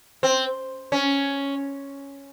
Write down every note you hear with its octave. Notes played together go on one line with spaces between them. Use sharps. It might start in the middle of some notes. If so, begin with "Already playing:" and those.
C4
C#4